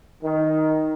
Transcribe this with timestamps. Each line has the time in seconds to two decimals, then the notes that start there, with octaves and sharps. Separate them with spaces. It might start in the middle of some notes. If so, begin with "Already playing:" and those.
0.23 D#3